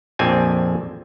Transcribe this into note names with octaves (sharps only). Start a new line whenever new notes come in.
A#1 F2 C4 G#5